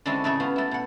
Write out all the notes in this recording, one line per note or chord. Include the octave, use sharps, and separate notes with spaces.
D3 G#3 C4 C#4 E4 A4
A2 C#3 A3 E4 G#4
B3 F4 F#4
A3 E4
B2 F#5